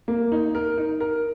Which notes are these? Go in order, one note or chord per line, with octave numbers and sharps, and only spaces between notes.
A#3
D#4
A#4
D#4
A#4